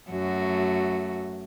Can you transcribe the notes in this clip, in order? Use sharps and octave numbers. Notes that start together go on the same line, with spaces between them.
F#2 A3 F#4